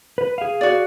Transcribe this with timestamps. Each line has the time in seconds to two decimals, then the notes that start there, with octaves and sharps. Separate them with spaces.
0.18 B4
0.38 G#4 F5
0.61 F#4 D5